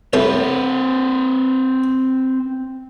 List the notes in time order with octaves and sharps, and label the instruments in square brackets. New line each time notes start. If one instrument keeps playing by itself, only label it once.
[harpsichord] C2 A2 A3 [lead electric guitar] C4 B4